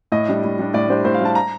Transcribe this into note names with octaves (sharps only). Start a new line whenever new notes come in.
A2 D#5
G3 D4
A2
G3 D4
A2 D5
G3 D4 C5
A2 C5
F5
G3 D4 A5
A#5